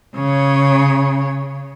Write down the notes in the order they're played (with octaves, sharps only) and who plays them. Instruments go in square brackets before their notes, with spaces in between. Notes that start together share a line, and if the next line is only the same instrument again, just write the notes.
[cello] C#3 C#5